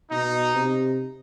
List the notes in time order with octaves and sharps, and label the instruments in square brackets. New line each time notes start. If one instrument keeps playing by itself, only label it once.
[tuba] B2 [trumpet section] D#4
[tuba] C3